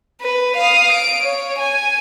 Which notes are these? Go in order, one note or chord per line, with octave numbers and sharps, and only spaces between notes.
B4
F5 D#6
D7
C#5
G#5